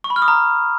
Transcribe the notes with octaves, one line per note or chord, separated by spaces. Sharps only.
C#6
B5
F6
D#6
A#5